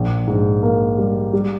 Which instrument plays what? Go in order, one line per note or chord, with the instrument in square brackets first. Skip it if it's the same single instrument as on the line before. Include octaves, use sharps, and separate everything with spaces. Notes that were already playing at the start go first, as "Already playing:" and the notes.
Already playing: [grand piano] A#1
G#2
A#3
G3
G3